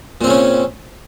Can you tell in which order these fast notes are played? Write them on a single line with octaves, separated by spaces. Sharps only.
A#2 C4 C#3 C#4